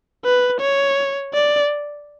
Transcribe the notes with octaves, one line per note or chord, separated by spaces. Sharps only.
B4
C#5
D5